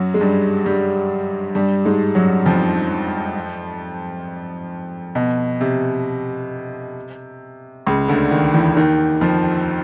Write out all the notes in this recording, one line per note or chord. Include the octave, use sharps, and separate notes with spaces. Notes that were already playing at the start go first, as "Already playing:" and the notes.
Already playing: F#2 F#3
G#3
G2 G3
G2 G3
G2 G3
G#2 G#3
F#2 F#3
F2 F3
B2
C3
C#2 C#3
D2 D3
D#2 D#3
E2 E3
D#2 D#3
F2 F3